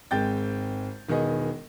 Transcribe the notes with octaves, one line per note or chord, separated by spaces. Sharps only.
G#1 G#3 C4 G5 G6 A6
E1 D#3 B3 G#4 D#5